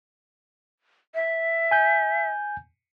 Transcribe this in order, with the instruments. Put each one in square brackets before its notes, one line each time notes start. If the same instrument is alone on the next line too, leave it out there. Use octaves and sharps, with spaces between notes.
[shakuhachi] E5
[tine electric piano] G#5 G6